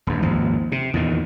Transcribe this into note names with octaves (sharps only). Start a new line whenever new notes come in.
D#1 G2
G#1 D#2 F3
C3
E2 A#2 D#3